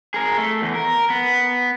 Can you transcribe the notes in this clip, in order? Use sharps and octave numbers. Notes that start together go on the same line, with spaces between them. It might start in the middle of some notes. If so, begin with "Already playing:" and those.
G#4 A#4
A3
E2
A#4
B3